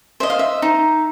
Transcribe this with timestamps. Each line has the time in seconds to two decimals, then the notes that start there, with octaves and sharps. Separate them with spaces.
0.20 C5 D#5 E5
0.30 F5
0.39 E5
0.62 D#4